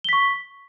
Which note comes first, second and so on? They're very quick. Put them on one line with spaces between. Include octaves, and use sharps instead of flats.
G7 B6 C#6